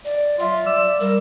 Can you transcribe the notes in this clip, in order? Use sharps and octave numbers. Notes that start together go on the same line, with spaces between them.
D5
F#3 F4 E5
D5 E6
G3 A#4